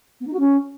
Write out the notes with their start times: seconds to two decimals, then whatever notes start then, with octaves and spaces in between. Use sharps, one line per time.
0.20 B3
0.26 D#4
0.33 F#4
0.39 C#4